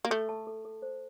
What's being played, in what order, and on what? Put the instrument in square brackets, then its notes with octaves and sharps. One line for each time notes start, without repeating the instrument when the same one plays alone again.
[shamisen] A#3
[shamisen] A3 [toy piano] A4
[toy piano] A5
A4
A4
C5